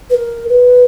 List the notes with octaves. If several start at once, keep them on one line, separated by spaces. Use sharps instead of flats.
B4
A#4
B4